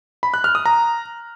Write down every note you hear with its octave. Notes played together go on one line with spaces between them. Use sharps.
B5
F#6
F6
D#6
A#5